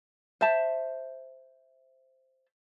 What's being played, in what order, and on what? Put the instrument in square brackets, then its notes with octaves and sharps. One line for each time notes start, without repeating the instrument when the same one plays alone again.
[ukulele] C5 E5 A5